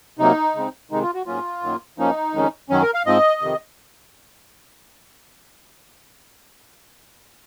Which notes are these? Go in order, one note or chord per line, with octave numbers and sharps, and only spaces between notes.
C3 F#3 A#3 D#4
C#3 G#3 C4
C3 D#3 G#3 D#4
F4
F#4
G#2 F#3 A#3 C#4 F4
F#2 D#3 F#3 A#3
F#2 F3 A#3 C#4 D#4
F2 D#3 G#3 C#4
F#2 D#3 F#3 C#4
A#4
F5
G#2 F3 C4 D#5
F2 C3 D#3